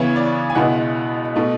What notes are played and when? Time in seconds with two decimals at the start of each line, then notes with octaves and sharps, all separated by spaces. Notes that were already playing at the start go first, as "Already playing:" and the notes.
Already playing: C#3 E3 B3 E4 C#5
0.16 D5
0.50 G#5
0.55 C#2 B2 G#3 B3 E4 F#5
1.36 B2 A3